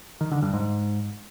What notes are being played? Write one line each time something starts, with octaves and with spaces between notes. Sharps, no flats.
D#3
D3
G2
G#2